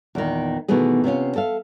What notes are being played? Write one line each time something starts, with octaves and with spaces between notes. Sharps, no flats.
E2 A#2 D#3
B2 D#3 E3 A3 B3 G#4
C3 B3 C#4 F4
A4 E5 F5